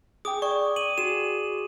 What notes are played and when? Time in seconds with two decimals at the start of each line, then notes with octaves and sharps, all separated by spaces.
0.25 G#4 G5 D6 D#6
0.42 D5 C#6
0.76 D#7 F#7
0.98 F#4 G#4 E7